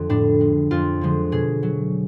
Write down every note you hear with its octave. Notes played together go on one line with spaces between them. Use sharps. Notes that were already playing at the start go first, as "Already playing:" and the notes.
Already playing: F2 D3 F3
A2 D4
G#3
F2 F4
D3 F3 G#3
B2 G#4
F#3